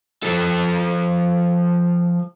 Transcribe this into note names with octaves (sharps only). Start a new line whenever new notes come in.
F3 A4